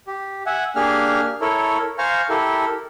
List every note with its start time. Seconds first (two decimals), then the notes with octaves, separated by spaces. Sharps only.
0.07 G4
0.46 E5 F#5 G#5
0.76 A#3 D4 G4 G#4 G#5 F6
1.41 E4 A4 A#4 C#5
1.98 C5 F5 G#5 A#5 C#6 F6
2.30 E4 G4 A4 A#4